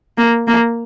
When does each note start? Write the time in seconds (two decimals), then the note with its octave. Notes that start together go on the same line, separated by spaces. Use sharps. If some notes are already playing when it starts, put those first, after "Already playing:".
0.18 A#3
0.47 A#3